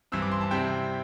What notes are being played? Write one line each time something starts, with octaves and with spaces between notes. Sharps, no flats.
G2 E3 C4 E6
D6
C6
A5
C3 G3 C4 E4 G5